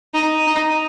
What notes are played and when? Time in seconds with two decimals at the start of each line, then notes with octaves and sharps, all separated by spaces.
0.14 D#4
0.47 D#4